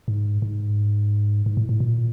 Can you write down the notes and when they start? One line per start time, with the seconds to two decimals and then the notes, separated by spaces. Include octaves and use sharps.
0.08 G#2
0.42 G#2
1.46 G#2
1.57 A2
1.69 A2
1.80 A#2